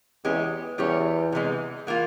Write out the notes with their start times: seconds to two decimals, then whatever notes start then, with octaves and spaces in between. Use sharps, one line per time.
0.25 E2 G#3 C#4 G4
0.78 E2 G3 C#4 G4 C#5
1.32 C3 E3 G#3
1.87 E3 A#3 F4